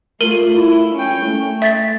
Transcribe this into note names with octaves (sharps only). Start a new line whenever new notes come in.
A3 F4 A#4 D#7 F#7
E4
C#4 G5
A3
E5 A6 B6